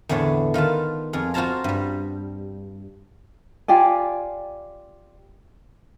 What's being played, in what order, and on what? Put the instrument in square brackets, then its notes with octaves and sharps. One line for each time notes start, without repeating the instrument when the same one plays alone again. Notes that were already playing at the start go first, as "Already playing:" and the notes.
[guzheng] E2 A2 D3 B3 C#5 A5
D#3 F4 B4 A5
F2 F4 G#4
F4 F#4 C5 F5 A5 A#5
G2 G3
[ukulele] F4 G4 D5 G#5